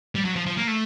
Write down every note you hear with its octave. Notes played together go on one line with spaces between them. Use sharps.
G3
F#3
F3
F3
A#3
A3